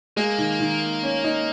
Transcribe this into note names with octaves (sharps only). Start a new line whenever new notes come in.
G#3 A#3
D#3
D#3
C#4
D#4